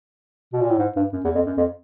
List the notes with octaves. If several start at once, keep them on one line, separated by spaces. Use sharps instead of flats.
B2
A#2
A2
G#2
G2
F#2
E2
F2
F#2
F2